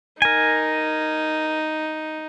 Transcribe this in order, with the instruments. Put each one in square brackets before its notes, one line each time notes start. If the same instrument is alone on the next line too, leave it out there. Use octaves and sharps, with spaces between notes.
[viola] D#4 [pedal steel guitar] A#4 G#5